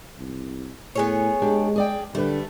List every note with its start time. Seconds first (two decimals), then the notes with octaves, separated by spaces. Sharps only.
0.18 C2
0.95 A2 B3 G#4 C#5
1.42 G#3 D4 G4
1.76 G#4 D5 G5
2.15 D3 G3 A3 B4